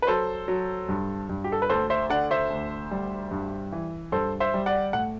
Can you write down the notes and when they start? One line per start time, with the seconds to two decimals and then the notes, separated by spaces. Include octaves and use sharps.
0.02 B4
0.07 F#3 A4 C5
0.48 F#3
0.89 G2
1.29 G2
1.44 G4
1.52 A4
1.62 B4
1.70 D2 A4 C5
1.90 C5 E5
2.10 D3 D5 F#5
2.31 C5 E5
2.50 D2
2.91 G3
3.31 G2
3.73 E3
4.12 G2 A4 C5
4.40 C5 E5
4.54 G3
4.66 D5 F#5
4.93 A2 F#5